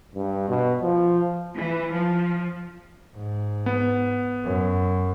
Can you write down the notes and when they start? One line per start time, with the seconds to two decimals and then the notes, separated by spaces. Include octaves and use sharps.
0.15 G2
0.48 B2
0.82 F3
1.54 E3
1.93 F3
3.16 G#2
3.66 B3
4.44 F#2